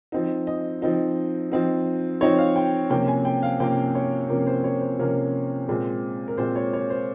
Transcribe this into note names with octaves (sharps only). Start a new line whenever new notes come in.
F3 C4 D#4
D#5
F3 C4 D#4
F3 C4 D#4
F3 C4 D#4 C#5
F5
G5
C3 F3 A#3 C#4 G5
G#5
G5
F5
C3 F3 A#3 C#4 G5
C#5
C3 F3 A#3 C#4 A#4
C5
C#5
C5
C3 F3 A#3 C#4 A#4
A#2 G#3 C4
A#4
A#2 G#3 C4 C5
C#5
C#5
C5